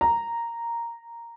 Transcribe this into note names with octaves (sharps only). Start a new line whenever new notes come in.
A#5